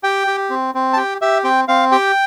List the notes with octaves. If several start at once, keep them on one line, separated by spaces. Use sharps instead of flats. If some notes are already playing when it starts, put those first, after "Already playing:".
G4 G5
G4
C4
C4
A5
G4 G5
G4 E5
C4 G5
C4 F5
G4 G5